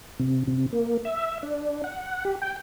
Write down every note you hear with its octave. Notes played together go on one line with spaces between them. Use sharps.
C3
C3
A#3
E5
D4
F#5
G4
G5